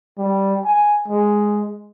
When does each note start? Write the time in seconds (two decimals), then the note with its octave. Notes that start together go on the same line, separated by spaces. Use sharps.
0.18 G3
0.65 G#5
1.08 G#3